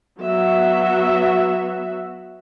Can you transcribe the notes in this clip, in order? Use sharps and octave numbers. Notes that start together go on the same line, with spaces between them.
F#3 B3 F#4 E5